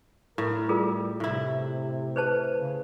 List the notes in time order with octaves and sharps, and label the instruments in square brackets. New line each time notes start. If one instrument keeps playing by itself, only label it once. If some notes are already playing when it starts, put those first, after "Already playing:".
[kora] A2 [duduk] A#4
[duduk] G3 [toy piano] F4 G#4 A#4
[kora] A2 E4 [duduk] C3
[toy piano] B4 C5 A5
[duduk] C#3